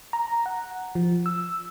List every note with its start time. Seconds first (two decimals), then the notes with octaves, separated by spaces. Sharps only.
0.13 A#5
0.46 F#5
0.95 F3
1.26 E6